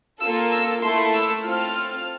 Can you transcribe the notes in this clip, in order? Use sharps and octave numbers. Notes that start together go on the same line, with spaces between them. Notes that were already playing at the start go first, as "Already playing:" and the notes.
A#3 F4 A4 E6
E6
A3 E4 A4 C6
E6
C4 F4 A4 F6